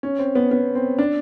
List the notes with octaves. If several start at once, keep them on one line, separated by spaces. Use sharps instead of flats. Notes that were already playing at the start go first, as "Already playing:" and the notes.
C#4
C4
B3
B3
C4
D4